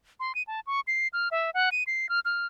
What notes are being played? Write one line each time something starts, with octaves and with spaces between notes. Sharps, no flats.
C6
D#7
A5
C#6
C7
F6
E5
F#5
D#7
C7
F6
F6